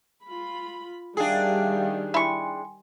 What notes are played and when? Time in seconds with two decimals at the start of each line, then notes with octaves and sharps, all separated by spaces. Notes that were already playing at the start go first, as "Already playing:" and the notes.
0.26 F4 B5
1.17 D#3 G3 D4 D#4 G#4 E5 F5 G5
2.14 E4 G5 G#5 C6 C#6